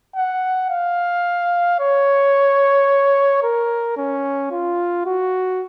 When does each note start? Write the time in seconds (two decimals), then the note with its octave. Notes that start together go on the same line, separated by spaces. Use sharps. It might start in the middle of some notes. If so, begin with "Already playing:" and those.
0.16 F#5
0.70 F5
1.80 C#5
3.43 A#4
3.97 C#4
4.51 F4
5.06 F#4